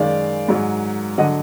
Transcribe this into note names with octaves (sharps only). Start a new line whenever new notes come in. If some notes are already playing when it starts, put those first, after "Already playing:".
Already playing: F#2 D#3 G#3 D5 F5
G#2 F#3
D3 F#3 D#5 F#5